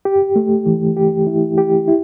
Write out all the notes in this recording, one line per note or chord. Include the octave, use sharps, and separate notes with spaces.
G4
A3
E3
G4
E4
G4
E4